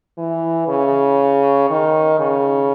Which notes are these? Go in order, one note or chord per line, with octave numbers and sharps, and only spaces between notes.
E3
C#3
D#3
C#3